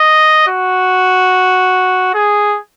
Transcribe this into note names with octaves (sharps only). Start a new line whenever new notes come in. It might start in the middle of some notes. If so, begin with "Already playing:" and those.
Already playing: D#5
F#4
G#4